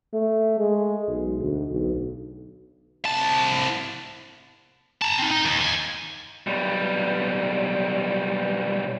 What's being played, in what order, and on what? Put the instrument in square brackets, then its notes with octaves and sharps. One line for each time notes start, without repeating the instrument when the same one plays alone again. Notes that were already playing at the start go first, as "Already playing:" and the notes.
[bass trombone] A3
G#3
B1
D2
B1
[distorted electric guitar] C2 A5
A5 A#5
C4 D#4
D#4
D#2
D#2 G#5
[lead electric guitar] B1 G3